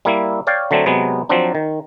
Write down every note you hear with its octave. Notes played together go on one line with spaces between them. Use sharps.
G3 A#3 E4
C#5 D5 F5 G5
D3 F#3 A3 C4 D4
C3 F#3 G#3 B3
F3 F#3 C4 D4
D#3